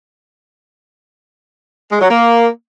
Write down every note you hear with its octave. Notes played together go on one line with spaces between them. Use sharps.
G#3
F#3
A#3